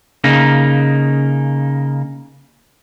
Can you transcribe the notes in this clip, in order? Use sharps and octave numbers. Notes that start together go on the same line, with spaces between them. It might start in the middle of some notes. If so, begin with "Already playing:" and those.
C#3 A#3 D#4